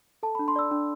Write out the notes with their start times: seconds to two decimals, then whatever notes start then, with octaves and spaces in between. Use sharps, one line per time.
0.23 A4 A5
0.35 D4 B5
0.48 C6
0.56 D5 E6
0.71 D4